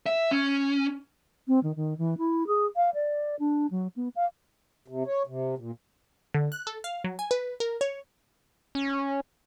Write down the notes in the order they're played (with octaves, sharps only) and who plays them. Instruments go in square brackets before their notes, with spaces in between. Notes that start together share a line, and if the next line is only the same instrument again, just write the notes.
[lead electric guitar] E5
C#4
[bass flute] C4
D#3
D#3
E3
E4
G#4
F5
D5
D4
F#3
B3
F5
[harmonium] C3
C#5
C3
A#2
[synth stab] D3
F#6
A4
F5
F#3
G#5
B4
A#4
C#5
[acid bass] C#4